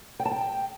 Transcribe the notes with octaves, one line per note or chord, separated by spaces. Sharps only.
G5
A5
G5